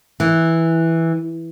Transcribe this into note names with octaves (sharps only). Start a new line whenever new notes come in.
E3